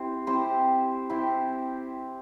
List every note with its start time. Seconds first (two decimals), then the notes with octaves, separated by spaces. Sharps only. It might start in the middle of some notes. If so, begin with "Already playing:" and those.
Already playing: C4 E4 G4 C5
0.27 C4 E4 G4 C5
1.10 C4 E4 G4 C5